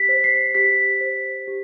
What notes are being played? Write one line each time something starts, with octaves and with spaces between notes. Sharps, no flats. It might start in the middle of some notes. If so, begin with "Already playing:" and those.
Already playing: G4 B6
C5
C7
G4 B6
C5
G4